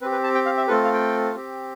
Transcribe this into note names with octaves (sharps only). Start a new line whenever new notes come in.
C4 G4 B4
B4
A5
G5
F5
E5
A3 C4 F4 A4 B4
F5
G5
C4 G4